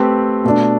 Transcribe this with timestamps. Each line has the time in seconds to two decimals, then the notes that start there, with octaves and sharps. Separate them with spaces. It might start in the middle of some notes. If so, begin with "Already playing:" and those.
Already playing: A3 C4 G4 B4
0.44 B2 A3 D4